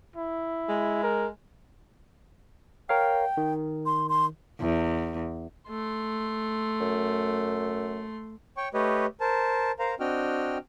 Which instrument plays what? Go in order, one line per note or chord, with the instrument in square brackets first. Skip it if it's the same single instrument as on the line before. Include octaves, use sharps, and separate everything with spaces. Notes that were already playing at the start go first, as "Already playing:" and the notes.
[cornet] E4
[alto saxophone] G#3
[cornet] A#4
[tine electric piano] A#4 C#5 F5 [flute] G5
[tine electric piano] D#3
[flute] C6
C6
[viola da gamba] E2
[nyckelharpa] A3 C6
[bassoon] F#2
[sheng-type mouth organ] C#5 G5 C#6
A3 G4 B4 C#5 D#5
A#4 C5 A5
A#4 C5 F5 A#5
C4 D4 F#4 D#5 G5 F6